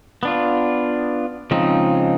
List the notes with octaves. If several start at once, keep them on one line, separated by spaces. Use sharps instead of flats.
B3 D4 F4
C#3 F3 G#3 C4 D#4